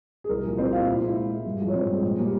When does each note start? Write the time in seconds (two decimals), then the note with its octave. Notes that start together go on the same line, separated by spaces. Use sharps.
0.24 G#4
0.29 C2 A#4
0.44 A#2 F3
0.58 C2 C4 C5
0.72 A#2 F3 F4 F5
0.87 A#2 E4 E5
1.01 G#3 E4 E5
1.16 A#2
1.31 G#3
1.45 G2
1.60 F3 G#3
1.68 C#5
1.74 G2 C4 C5
1.89 F3 G#3
2.03 A#2
2.18 G3 A#3